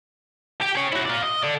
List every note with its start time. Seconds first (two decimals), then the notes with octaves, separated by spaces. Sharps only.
0.61 G4 G5
0.75 G#4 C#5
0.92 E4 F#4
1.05 F4 D5
1.23 D#5
1.43 A4 D5